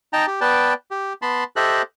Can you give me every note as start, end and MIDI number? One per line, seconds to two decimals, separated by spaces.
0.13 0.26 63
0.13 0.26 79
0.13 0.26 81
0.13 0.26 82
0.27 0.40 67
0.41 0.74 59
0.41 0.74 71
0.41 0.74 74
0.41 0.74 79
0.41 0.74 81
0.91 1.13 67
1.22 1.44 59
1.22 1.44 81
1.22 1.44 83
1.22 1.44 84
1.56 1.82 67
1.56 1.82 69
1.56 1.82 72
1.56 1.82 75
1.56 1.82 76
1.56 1.82 90